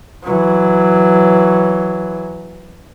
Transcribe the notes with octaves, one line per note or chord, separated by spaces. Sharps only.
E3 F#3